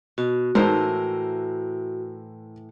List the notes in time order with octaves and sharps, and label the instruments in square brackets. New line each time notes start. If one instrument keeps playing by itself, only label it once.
[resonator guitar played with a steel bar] B2 [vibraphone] F#4
[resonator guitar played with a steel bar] A2 E3 [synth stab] G#3 D#4 [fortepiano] A#4 C5